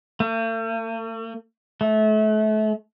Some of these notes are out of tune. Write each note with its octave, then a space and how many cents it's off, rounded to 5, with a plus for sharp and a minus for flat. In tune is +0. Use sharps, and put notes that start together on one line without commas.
A3 +45
A3 -30